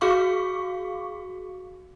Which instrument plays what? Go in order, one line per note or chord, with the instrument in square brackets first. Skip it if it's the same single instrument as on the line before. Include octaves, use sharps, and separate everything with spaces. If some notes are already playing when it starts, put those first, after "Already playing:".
[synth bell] F#4 G#4 F5 C#6 D6